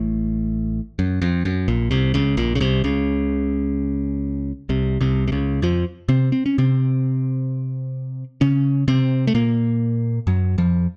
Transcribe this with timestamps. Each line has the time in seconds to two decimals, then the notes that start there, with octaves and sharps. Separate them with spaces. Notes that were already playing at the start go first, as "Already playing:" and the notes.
Already playing: A1 A2
0.99 F#2
1.22 F2
1.45 F#2
1.68 A#1 A#2
1.91 C2 C3
2.14 C#2 C#3
2.37 A#1 A#2
2.55 C#3
2.60 C2 C3
2.84 C#2 C#3
4.69 C2 C3
5.01 C2 C3
5.28 C3
5.32 C#2 C#3
5.62 F2 F3
6.09 C3 C4
6.32 C4
6.46 C#4
6.58 C3 C4
8.41 C#3 C#4
8.88 C3 C4
9.27 A3
9.35 A#2 A#3
10.27 F#2 F#3
10.58 F2 F3